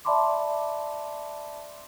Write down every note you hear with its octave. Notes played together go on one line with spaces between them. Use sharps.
D5 E5 A5 B5 C6 D6